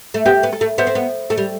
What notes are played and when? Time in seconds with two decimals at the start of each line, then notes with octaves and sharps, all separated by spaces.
0.14 A3
0.25 B3 G4
0.43 B3
0.53 A4
0.61 A3
0.78 B3 C5 E5
0.87 C4
0.95 B3
1.30 A3
1.37 G3